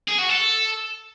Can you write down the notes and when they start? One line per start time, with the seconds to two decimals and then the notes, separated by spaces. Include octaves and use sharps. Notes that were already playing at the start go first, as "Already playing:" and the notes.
0.08 G#4
0.18 F#4
0.29 A4